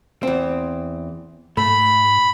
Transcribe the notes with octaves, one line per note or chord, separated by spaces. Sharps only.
E2 C4
G#2 A3 B5